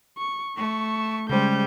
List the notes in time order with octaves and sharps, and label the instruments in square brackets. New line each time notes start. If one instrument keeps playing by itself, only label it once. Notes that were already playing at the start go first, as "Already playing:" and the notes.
[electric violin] C#6
[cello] A3 [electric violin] C#6
[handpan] C#3 G#3 C5 [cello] G3 [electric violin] C#4 G6